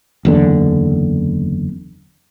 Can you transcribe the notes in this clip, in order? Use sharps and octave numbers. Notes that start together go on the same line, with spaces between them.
F#1 E2 D3